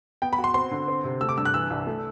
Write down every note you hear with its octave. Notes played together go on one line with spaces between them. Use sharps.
B3 G5
B5
F#4
C6
C4 C6
D3
C4
C3
A3 E6
D6
G2 E6
F#6
E3 E6
C2
A3